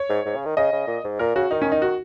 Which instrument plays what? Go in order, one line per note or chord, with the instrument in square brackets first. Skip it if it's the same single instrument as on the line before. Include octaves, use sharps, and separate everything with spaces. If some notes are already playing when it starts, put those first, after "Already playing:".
Already playing: [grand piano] C#5
[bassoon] G#2
G#2
C#3
D#3
[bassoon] C#3 [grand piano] D#5
[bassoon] C#3
A#2
G#2
[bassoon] A#2 [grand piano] A#4
[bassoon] C#3 [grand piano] F#4
[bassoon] D#3 [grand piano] D#4
[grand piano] C#4
D#4
F#4